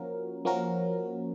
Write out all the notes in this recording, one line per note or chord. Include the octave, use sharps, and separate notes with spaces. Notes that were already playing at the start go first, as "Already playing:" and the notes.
Already playing: F3 A#3 C#4 F#4 A#4
F3 A#3 C#4 F#4 A#4